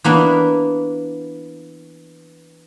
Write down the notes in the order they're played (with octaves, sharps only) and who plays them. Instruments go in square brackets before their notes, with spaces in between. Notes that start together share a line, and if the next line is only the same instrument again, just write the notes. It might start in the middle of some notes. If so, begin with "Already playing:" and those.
[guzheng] E3 A#3 B3 D4